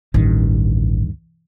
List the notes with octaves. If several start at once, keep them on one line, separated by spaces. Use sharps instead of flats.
A1 D2 G2 D#3